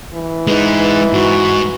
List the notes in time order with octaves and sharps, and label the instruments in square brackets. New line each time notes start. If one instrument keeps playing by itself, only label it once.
[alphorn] E3
[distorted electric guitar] G#3 D#4 [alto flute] B4
[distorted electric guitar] G#2 [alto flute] F#4